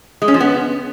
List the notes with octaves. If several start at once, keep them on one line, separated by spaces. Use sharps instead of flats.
G#3
C#4
F3
B3